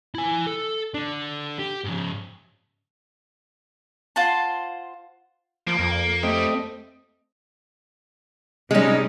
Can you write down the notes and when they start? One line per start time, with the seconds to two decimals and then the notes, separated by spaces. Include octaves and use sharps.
0.15 E4 G#5
0.46 A4
0.94 D3 D4
1.59 G4
1.85 G#2 F3
4.16 F4 C5 F#5 A5
5.67 F3 A#3
5.79 F2
6.23 G3 A3 C4 G4 D#5
8.71 C3 G3 G#3 C#4 D#4